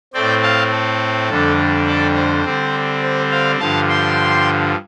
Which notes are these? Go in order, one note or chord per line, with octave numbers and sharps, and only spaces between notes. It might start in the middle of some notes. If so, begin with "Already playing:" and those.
A2 A3 C4 D5 G5
F5 A5
A4
F2 D3 G3 D4
A4 D5
C5
D3 G3 C4
C5
C5 F5
G2 D3 F3 F5 A5
G5 C6